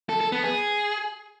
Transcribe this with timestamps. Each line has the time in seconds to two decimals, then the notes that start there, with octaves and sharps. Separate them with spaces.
0.09 A4
0.21 A4
0.32 B3
0.44 G#4